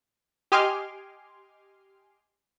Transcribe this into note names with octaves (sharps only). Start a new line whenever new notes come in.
G4 D#5 G#5 C6 D6 F6